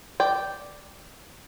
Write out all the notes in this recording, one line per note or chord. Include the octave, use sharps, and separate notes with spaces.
D5 G5